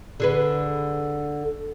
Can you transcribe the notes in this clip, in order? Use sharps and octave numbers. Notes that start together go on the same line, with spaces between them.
D3 G#4 B4